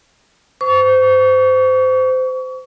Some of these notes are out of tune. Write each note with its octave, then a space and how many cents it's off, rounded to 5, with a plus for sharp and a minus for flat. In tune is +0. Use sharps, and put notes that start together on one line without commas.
C5 -25 C#6 +35